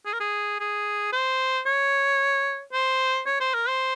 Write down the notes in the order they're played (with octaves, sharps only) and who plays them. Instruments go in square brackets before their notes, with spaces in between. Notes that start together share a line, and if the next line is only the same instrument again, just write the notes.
[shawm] G#4
A#4
G#4
G#4
C5
C#5
C5
C#5
C5
A#4
C5